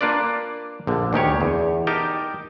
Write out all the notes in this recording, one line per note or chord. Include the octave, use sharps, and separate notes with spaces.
A#3 D4 F4 B4 D5
A#1 D3
D2 D#3 G4 C#5
E2
D#4 G4 A#4 G5 A5